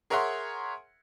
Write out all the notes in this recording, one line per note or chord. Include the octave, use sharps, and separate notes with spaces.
G#4 A#4 C#5 E5 F#5 C6